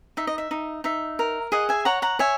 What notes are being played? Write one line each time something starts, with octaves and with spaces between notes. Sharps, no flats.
D#4 E5
D#5
E5
D#4
D#4 E5
A#4
G#4 D#5 F#5
E5 G#5
C#5 F#5 A#5
F#5 A#5
C#5 E5 G#5